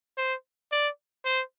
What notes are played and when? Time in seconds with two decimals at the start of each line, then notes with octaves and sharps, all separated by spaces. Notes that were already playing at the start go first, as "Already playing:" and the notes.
0.18 C5
0.72 D5
1.25 C5